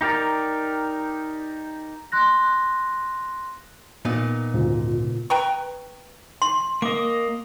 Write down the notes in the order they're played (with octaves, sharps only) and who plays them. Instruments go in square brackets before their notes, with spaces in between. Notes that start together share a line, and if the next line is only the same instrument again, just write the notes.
[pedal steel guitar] D#4 G4 A#4 D5
[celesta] C6 F#6 A#6
[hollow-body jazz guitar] A#2 B3 D#4
[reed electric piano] D2 G#2 C#3 [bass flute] F4
[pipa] B4 G5 A#5 C#6
[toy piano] C6
[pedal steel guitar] A#3 D#5 [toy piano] D6